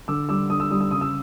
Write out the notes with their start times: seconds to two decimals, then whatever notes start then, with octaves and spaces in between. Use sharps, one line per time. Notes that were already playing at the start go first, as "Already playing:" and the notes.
0.08 D3 D6 E6
0.29 G3 D6 E6
0.50 D3 D#6
0.60 E6
0.71 G3 D#6
0.81 E6
0.91 C#3 D#6
1.01 E6